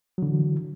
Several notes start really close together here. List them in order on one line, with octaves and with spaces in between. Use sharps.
F#3 D3 E3